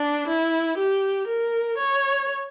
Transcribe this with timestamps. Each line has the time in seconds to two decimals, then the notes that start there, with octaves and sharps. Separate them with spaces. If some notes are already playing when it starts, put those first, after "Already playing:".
Already playing: D4
0.28 E4
0.78 G4
1.28 A#4
1.78 C#5